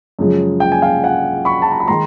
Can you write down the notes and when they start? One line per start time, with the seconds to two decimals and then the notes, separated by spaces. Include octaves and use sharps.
0.19 F#2 C#3 F3 G#3
0.60 G5
0.72 G#5
0.82 F5 G5
1.04 F#5 G#5
1.45 B5 C#6
1.62 A5
1.72 A#5
1.80 B5
1.88 D#3 G#3 A#5 C6